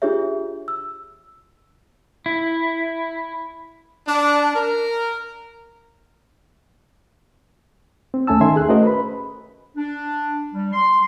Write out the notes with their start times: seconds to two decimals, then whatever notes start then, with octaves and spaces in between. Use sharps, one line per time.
0.02 D4 F4 G4 G#4 C#5 E5
0.68 E6
2.26 E4
4.07 D4
4.55 A#4
8.14 C4
8.27 D#2 A3 C#4 G#5 A5 E6
8.41 D#3 C#4 A4 E5 G#5 C6
8.56 G#4 F#6
8.69 A3 C#4 F#4 A#4 C5 D#5
8.84 B4 B5
9.77 D4
10.54 G3
10.73 C6